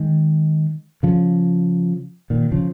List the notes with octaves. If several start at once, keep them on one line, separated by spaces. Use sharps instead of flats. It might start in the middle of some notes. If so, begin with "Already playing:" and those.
Already playing: D#3 G#3
C#3 F3
A#2 D#3
C#3 F3